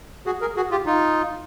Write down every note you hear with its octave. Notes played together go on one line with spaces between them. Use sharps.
F#4 G#4
G#4 A#4
F#4 G#4
F4 G4
D#4 F4